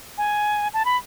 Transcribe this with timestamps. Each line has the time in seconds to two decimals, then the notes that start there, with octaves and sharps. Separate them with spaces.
0.18 G#5
0.74 A5
0.85 B5